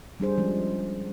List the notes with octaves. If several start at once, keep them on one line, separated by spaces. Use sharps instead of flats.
G3 D4 G#4 C5
F3 G#3 C#4